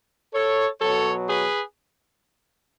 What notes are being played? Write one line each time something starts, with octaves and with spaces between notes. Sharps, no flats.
A4 C#5
B2 F#3 A4 C#5
G#4 B4